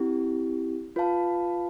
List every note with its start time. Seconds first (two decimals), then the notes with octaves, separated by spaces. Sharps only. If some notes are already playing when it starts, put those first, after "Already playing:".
Already playing: C4 E4 G4
0.96 F4 B4 F5 A5